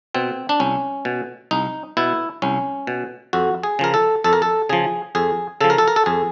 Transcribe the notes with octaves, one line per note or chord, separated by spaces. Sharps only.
B2 C4
D4
C2 C#4
B2
C2 D#4
B2 E4
C2 C#4
B2
F2 F#4
G#4
C#3 F3 A#4
A4
F2 A4
A#4
A4
C#3 F3 G#4
F2 G#4
C#3 F3 A4
A#4
A4
A#4
A4
F2 G#4